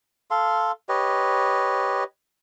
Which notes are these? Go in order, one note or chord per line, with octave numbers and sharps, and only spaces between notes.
A4 F5 C6
G4 B4 C#5 D#5